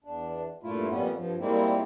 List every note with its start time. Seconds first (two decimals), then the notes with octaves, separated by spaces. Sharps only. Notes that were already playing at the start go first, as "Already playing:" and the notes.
0.04 E2 D4
0.63 G2 A#2 A3 E4 F4
0.89 F2 A#2 G3 B3 C#4
1.15 G2 F3
1.40 A#2 G3 G#3 A#3 C4 E4